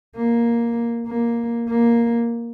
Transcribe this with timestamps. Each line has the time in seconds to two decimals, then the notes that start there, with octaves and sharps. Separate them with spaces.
0.17 A#3
1.08 A#3
1.69 A#3